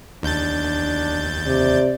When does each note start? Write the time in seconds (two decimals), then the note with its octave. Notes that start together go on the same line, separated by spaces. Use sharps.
0.23 D#2 D4 G6 A6
1.47 C3 D5